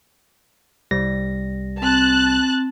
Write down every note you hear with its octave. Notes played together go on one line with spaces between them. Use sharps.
C2 G3 A#6
C4 A5 F#6